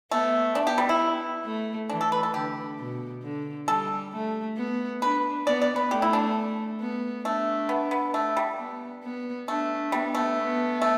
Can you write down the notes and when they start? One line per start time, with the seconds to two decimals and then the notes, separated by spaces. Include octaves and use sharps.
0.11 A3 B3
0.55 B3 D4
0.67 G4
0.78 G3
0.89 E4
1.44 A3
1.89 E3 D4
2.01 A4
2.12 B4
2.23 A4
2.34 D3 G4
2.79 B2
3.23 D3
3.67 G3 A4
4.13 A3
4.57 B3
5.02 D4 B4
5.47 B3 D5
5.62 D5
5.76 B4
5.91 A3 G4
6.02 E4
6.13 D4
6.80 B3
7.25 A3 D4
7.69 B3
7.91 B3
8.14 A3
8.37 G3
8.58 B3
9.03 B3
9.48 A3 D4
9.92 G3 B3
10.15 A3
10.38 B3
10.82 A3